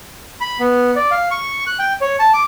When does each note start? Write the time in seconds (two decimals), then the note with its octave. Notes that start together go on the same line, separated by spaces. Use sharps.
0.41 B5
0.60 B3
0.96 D5
1.11 F5
1.31 C#6
1.67 F#6
1.79 G5
2.01 C#5
2.20 A5
2.34 D6